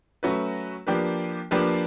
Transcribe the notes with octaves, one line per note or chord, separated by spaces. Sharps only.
F#3 A3 C#4 F#4 B4
F3 A#3 D4 G4 B4
F3 A#3 D4 G4 B4